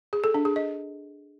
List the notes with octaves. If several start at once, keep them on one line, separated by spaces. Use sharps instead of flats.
G#4
A4
D4
G#4
D#5